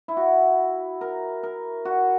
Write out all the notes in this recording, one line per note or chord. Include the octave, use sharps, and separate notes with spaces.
E4
F#4
A#4
A#4
F#4